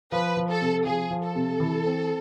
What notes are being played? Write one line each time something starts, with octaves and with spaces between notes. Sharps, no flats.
F3 B4
F3
A4
C3
F3 G#4
F3
A4
C3
E3
C4